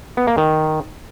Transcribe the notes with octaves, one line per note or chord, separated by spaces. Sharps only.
B3
A#3
D#3